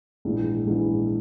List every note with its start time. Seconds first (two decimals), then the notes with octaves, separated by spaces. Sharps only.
0.25 A#1 G#2 E3
0.67 A#1 G#2 E3